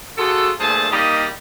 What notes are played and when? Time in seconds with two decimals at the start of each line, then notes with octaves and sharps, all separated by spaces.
0.17 F4 F#4 G#4 A4
0.60 G2 A#2 A3 G#4 C5 A5
0.91 G3 A#3 D#4 G4 D#5